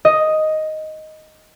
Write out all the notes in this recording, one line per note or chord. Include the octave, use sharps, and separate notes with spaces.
D#5